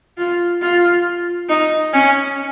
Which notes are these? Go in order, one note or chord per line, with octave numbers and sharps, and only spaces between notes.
F4
F4
D#4
C#4